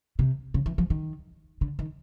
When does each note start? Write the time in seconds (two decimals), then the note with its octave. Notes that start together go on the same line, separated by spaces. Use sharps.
0.19 C3
0.54 C#3
0.66 E3
0.78 F3
0.90 D#3
1.61 D3
1.79 D#3